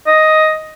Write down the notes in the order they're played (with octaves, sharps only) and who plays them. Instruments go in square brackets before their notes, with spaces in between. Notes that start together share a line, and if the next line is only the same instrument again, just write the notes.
[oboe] D#5